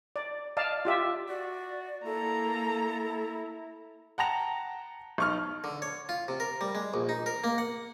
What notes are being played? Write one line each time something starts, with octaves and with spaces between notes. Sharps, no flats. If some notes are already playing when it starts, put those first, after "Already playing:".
D5
D5 D#5 F5 A5
F4 G4 E5
F#4 D5
A#3 E4 A4 A#5
F#5 G5 A5 A#5 A#6 F7
B1 C#6 F6
D3
C#5
F4
C3
A#4
G3
G#3
A#1
D#4
A#4
A#3
F#5